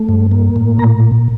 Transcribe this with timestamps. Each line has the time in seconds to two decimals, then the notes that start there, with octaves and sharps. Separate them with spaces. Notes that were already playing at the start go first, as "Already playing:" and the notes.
Already playing: A3
0.09 G2
0.31 A#3
0.56 A2
0.78 A#2 A#5